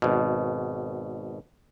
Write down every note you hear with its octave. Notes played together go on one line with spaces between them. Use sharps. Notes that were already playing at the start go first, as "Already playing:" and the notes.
G#1 B2